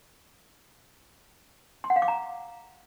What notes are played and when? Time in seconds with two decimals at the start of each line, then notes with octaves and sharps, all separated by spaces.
1.84 C6
1.90 F#5
1.96 F5
2.02 D6
2.08 A#5